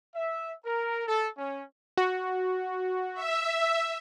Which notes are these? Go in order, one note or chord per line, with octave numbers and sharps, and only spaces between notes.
E5
A#4
A4
C#4
F#4
E5